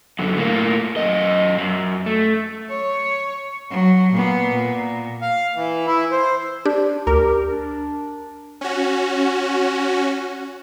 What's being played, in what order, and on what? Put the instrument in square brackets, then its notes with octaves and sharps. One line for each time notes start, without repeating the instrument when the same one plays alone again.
[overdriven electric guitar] F#2 D3
A2 A#3
F#2 D#5
F#2
A3
[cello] C#5
F#3
A#2 B3
A#2
[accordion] F5
E3
E4
C5
[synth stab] D4 [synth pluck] G4
[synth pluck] D2 [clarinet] G4 [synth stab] A#4
[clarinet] D4
[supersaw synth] C#4 F#4